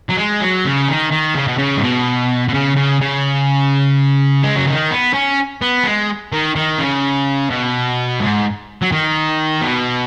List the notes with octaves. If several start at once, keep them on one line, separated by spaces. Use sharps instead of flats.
F#3
G#3
F#3
C#3
D#3
D#3
C#3
B2
C#3
G#2
B2
B2
C#3
C#3
C#3
G#3
F#3
D#3
B3
C#4
B3
G#3
D#3
D#3
C#3
B2
G#2
F#3
D#3
B2